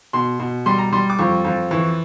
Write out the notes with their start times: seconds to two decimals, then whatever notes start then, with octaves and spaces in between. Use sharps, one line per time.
0.13 B2 C6
0.40 B2
0.66 G3 C6
0.78 A#5
0.92 G3 C6
1.10 D6
1.19 F2 C#6
1.45 F2
1.71 E3 C#6